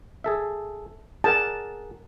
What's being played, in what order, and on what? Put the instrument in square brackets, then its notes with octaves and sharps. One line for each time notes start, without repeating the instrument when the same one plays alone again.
[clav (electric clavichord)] G#4 A4 E5
[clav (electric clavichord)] G#4 A#4 F#5 [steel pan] A5